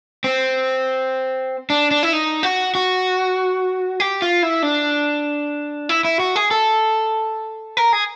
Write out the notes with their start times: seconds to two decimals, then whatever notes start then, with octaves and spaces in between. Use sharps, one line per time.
0.24 C4
1.70 D4
1.91 D4
2.03 E4
2.13 D#4
2.43 F#4
2.75 F#4
4.00 G4
4.22 F4
4.43 E4
4.63 D4
5.89 E4
6.05 E4
6.20 F#4
6.36 G#4
6.51 A4
7.77 A#4
7.93 G#4